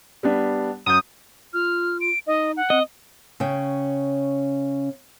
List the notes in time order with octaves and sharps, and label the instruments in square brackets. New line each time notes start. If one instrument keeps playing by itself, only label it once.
[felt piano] G3 B3 D4
[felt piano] F#2 G6 [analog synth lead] D#6
[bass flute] F4 [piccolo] F6
[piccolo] D7
[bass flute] D#4 [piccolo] D#5
[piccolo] F#5
[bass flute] C4 [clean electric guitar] D#5
[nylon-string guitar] C#3 C#4 G5